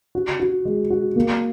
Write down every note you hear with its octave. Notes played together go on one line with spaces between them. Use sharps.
F#4
F#4
G#3
F#4
A#3